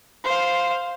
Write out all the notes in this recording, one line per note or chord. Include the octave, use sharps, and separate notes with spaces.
C5 F5